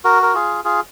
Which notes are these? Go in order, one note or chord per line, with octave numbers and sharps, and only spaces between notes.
F#4 A#4
A#4
F4 G#4
F4 G#4